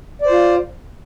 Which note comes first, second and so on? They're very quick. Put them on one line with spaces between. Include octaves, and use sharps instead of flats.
D5 C5 F4